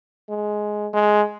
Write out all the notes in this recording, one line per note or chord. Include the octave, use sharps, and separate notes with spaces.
G#3
G#3